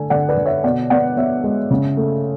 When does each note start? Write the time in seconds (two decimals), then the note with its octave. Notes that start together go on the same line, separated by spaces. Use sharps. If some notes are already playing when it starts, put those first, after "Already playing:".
Already playing: D3 A3 G#5
0.10 D3 D5 F#5
0.29 B4 D5
0.37 D3
0.46 C#5 E5
0.64 B2 D5 F#5
0.90 B3 D5 F#5
1.17 B3 C#5 E5
1.44 G#3
1.71 C#3
1.97 A3